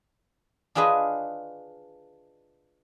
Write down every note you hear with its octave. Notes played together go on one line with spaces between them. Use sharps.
D4 F4 G#4 B4 D#5